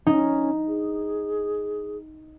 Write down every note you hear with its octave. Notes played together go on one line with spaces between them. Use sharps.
C#4 D#4
G#4